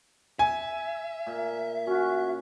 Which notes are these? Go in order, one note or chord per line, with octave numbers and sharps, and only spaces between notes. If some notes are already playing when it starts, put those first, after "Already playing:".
E5 G#5
A#2
C#4 F#4